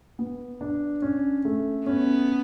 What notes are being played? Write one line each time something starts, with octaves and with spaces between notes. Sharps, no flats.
B3
D4
C#4
A3
B3 C#4